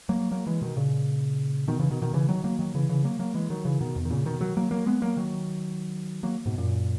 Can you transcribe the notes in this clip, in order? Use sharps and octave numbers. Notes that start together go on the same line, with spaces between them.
F#3 A#3
F#3 A#3
E3 G#3
B2 D#3
A#2 C#3
B2 D#3
C#3 E3
B2 D#3
B2 D#3
C#3 E3
D#3 F#3
F#3 A#3
D#3 F#3
C#3 E3
C#3 E3
F#3 A#3
F#3 A#3
E3 G#3
D#3 F#3
C#3 E3
B2 D#3
E2
D#3
A#2 C#3
B2 D#3
D#3 F#3
F#3 A#3
F#3 A#3
G#3 B3
F#3 A#3
D#3 F#3
F#3 A#3
G#2 B2
F#2 A#2